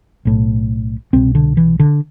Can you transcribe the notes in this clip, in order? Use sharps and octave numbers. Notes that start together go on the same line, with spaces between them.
B1 A2
C2 B2 C4
D3
E3
D3